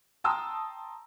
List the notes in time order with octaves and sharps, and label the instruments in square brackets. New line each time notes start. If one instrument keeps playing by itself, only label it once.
[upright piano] G5 A5 A#5 C6 D#6 E6